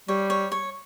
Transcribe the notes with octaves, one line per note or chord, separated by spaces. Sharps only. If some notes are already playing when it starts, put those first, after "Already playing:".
G3 C#5
C#5
C#5